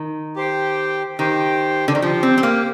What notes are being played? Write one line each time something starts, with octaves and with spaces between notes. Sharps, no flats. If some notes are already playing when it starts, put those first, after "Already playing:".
Already playing: D#3
G4 C5 G5
D#3 G4 C5 G5
D3
D#3
F3 G4 C5 G5
C4
C4
A#3